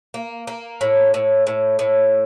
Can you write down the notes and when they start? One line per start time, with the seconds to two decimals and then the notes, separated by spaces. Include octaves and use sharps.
0.14 A#3
0.47 A#3
0.81 A2
1.14 A2
1.47 A2
1.79 A2